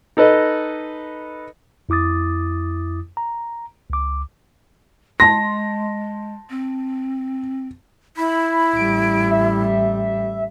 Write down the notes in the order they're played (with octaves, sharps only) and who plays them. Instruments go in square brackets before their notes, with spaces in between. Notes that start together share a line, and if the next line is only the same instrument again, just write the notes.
[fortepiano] D#4 A4 B4 D#5
[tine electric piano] F2 E4 D6 D#6 A6
A#5
C#2 D6
[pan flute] G#3 [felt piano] A5 C6 [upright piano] A#6
[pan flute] C4
[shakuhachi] E4 [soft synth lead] B5
[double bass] A1 G3 [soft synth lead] D7
[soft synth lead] E5